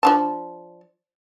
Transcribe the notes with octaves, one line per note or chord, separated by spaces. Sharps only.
F3 D4 A5